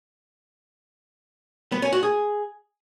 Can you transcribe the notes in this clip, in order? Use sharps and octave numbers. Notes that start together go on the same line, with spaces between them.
B3
C#4
F#4
G#4